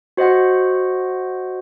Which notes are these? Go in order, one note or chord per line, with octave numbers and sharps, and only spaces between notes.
F#4 C5 D#5 F#5